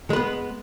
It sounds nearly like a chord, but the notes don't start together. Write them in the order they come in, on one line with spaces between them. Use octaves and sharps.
G#3 B4 B3